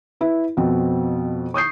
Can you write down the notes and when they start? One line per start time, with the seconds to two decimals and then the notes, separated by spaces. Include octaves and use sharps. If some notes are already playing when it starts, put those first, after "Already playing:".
0.21 E4 B4
0.57 F2 B2 C4
1.54 C#6 D#6 G6 C7